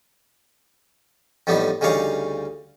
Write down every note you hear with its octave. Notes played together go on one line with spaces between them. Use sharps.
F2 A2 G3 B3 D#4
D2 C#3 G3 D#4 C#5 F5